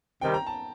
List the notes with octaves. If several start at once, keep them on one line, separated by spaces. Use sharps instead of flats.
C3 D#3 G3 G5
A#5
A5